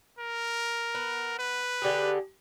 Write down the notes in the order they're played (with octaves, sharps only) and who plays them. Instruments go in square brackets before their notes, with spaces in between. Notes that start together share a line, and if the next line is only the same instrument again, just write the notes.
[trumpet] A#4
[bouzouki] B3
[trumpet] B4
[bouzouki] D3 G4 G#4